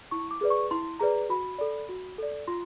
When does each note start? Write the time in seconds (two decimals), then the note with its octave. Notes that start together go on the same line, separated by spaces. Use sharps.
0.11 E4 C#6
0.31 D6
0.41 G#4 B4 D5
0.50 C#6
0.71 E4 C6
0.99 G#4 B4 D5 A#5
1.29 F#4 B5
1.58 A4 D5
1.89 F#4
2.18 A4 D5
2.48 F4 C6